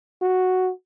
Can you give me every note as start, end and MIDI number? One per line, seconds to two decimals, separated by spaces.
0.22 0.71 66